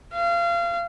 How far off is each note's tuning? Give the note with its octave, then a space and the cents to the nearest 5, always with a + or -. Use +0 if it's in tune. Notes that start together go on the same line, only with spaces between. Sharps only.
F5 -30